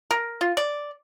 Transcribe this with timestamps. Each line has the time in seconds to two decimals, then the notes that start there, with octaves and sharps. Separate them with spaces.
0.11 A#4
0.41 F4
0.57 D5